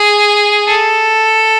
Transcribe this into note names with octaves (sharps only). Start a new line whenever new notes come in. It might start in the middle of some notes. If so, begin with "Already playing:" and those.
Already playing: G#4
A4